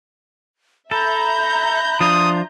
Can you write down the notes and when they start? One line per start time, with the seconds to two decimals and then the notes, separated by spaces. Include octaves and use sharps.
0.91 A4 E5 A#5 B5 G6
2.00 F3 D4 F4 D#6